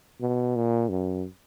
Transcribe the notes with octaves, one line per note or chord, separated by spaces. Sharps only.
B2
A#2
F#2